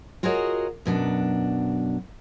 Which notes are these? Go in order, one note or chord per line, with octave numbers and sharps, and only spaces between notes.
F4 F#4 G#4 A#4 C#5 D#5
F#2 B2 F#3 D4